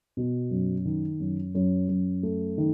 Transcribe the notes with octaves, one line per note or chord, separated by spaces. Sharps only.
B2
F#2
D#3
F#2
F#2
F#2
A3
D#3